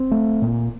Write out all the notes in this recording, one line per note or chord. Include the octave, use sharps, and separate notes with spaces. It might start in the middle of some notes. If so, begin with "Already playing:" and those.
Already playing: C4
A3
A#2